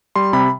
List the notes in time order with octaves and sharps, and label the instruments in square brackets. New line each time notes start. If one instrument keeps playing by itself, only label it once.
[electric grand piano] G3 C6
C3 B5